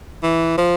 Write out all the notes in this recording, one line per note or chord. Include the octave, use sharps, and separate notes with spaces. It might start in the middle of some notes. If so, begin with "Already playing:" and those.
E3
F3